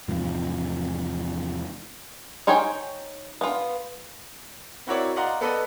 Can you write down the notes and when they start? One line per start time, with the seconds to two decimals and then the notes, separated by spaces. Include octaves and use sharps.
0.08 E2 G#2 C3 F3
2.47 D#4 C5 C#5 G5 G#5
3.41 B3 F4
4.87 C4 E4 F#4 A#4 C#5 D5
5.16 D5 D#5 F5 F#5 A#5 C6
5.41 B3 A4 B4 D5 D#5